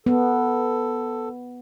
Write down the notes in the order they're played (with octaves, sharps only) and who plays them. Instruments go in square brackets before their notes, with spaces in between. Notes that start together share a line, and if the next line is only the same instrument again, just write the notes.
[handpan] B3 [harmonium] A4